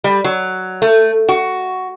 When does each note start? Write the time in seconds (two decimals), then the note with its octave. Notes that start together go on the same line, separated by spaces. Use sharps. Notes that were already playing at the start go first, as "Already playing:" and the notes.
0.04 G3
0.24 F#3
0.82 A3
1.29 F#4